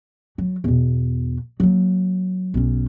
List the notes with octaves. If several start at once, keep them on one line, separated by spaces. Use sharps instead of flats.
F#3
E2 B2
F#3 A#3
B1 C#4